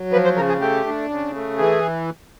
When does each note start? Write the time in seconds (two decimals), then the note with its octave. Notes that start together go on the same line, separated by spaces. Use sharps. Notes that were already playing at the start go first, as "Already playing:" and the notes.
Already playing: F#3
0.12 F3 B4
0.24 C5
0.36 C#3 A#4
0.48 G#4
0.61 A3 G4
0.86 D4
1.10 C#3
1.34 A3
1.58 E3 G#4